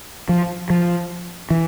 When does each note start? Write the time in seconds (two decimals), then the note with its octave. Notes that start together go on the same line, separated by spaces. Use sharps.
0.29 F3
0.70 F3
1.50 E3